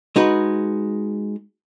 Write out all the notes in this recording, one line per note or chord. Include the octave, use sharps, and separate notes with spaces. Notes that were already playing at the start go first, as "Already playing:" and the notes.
G#3 D#4 F#4 B4